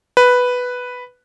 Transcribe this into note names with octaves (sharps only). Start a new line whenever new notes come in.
B4